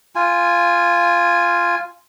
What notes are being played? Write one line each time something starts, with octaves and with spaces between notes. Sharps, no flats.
F4 G#5